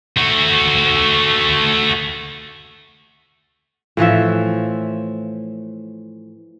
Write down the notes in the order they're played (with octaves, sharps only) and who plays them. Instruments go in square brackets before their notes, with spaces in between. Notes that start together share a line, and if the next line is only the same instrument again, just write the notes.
[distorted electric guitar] A3 F#4
[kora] A2 E3 F3 E5